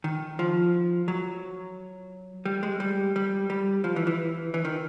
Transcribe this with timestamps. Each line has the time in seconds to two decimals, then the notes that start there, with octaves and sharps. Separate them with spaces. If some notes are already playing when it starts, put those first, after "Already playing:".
0.04 D#3
0.39 F3
1.08 F#3
2.45 G3
2.63 G#3
2.80 G3
3.16 G3
3.50 G3
3.84 F3
3.96 E3
4.07 E3
4.54 E3
4.65 D#3